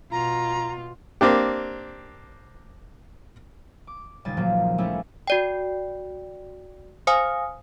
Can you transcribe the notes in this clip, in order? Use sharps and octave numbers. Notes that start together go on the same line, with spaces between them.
B2 F4 A#5
A#3 C4 D4 G4
D6
D#1 C#2 G3 G#4 A6
A#2 F3 F#3 A#3
F3 G3 A3 C#4 E4
F#4 D5 G5
C5 F5 G#5 D#6